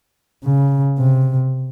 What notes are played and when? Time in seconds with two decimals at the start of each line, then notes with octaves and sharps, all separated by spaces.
0.44 C#3
0.98 C3